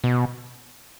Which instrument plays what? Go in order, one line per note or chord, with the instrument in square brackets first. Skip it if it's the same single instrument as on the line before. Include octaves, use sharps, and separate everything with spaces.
[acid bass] B2